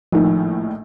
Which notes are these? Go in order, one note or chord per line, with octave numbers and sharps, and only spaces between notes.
A#1 A2 D#3 F3